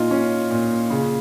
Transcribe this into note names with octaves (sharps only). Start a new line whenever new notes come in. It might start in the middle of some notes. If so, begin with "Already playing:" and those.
Already playing: A#2 D#4 F4
C#4
A#2
C#3